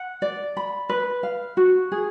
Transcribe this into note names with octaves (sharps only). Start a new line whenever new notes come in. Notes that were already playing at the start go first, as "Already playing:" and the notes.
Already playing: F#5
D5
B5
B4
F5
F#4
G#4